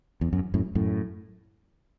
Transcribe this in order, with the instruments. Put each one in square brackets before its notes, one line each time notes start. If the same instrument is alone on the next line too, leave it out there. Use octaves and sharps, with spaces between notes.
[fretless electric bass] E2
F#2
F#2 A2
F#2 A2